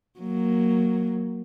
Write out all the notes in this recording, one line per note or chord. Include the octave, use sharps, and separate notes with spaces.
F#3 A#3